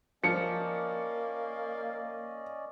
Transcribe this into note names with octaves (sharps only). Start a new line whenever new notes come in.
F3 A#3 C#4 D5 D#5 C#7